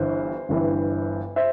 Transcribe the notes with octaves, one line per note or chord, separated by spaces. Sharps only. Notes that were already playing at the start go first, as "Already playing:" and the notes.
Already playing: G1 G2 E3 C5
G1 G2 E3
C5 E5